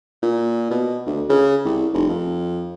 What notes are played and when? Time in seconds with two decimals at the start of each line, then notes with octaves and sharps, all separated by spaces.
0.22 A#2
0.71 B2
1.06 D2
1.30 C#3
1.65 C2
1.93 F1
2.09 F2